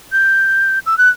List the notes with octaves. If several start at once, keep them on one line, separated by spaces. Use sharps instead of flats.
G6
E6
F#6